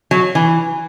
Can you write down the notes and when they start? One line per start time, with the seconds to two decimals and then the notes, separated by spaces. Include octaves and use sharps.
0.11 F#3
0.35 E3